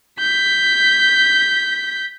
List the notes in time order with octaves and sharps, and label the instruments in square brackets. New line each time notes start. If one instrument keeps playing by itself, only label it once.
[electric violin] G6 B6